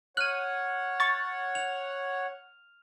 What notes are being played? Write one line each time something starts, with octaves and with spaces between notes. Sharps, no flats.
C#5 F#5 F6 F#6 D#7
C#6 A6
F7